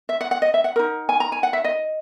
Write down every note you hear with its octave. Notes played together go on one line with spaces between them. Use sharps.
E5
F#5
F#5
D#5
E5
F#5
D#4 A#4
G#5
A#5
G#5
F#5
E5
D#5